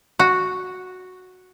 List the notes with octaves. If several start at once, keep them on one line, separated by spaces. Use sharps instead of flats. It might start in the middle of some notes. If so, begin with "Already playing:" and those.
F#4